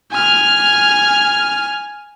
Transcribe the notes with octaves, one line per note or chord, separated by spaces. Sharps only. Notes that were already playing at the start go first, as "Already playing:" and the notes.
G#5 F6